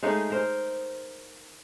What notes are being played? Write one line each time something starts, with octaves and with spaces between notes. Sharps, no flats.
G#3 A3 D#4 F5
A#4 C5